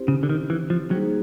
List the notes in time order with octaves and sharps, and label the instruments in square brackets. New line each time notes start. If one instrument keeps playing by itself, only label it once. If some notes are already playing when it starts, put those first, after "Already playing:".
Already playing: [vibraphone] C4 E4 G4 C5
[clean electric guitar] C#3
D3
D#3
E3
F3
[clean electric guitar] F#3 [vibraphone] G3 A#3 D#4 G#4 C5